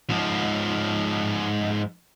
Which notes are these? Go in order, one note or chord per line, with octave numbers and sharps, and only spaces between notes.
G#2 F3